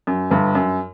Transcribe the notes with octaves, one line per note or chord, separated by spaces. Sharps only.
F#2
G1 G2
F#2